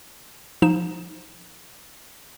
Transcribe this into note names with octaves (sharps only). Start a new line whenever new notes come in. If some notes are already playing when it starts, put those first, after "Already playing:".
F3 D#4 E7